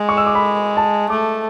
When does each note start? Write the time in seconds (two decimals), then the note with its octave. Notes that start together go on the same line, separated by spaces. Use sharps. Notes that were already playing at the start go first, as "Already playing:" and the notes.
Already playing: G#3
0.09 C#6
0.17 E6
0.27 D6
0.35 B5
0.77 A5
1.10 A3 D6